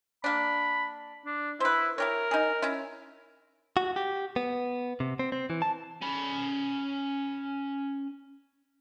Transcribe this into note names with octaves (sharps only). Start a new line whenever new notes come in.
A#3 D4 B5
D4
E4 B4 C5
E4 G4 A#4 C#5
D#4 G#4
C#4 E4
F#4
G4
B3
C3
C4
C4
E3
A5
C#4 B5